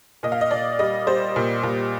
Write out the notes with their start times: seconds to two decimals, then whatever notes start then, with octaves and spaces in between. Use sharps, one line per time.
0.23 A#2 D#5
0.32 F5
0.41 D#5
0.51 A#2 D5
0.79 G3 D#5
1.07 G3 C5
1.36 A#2
1.63 A#2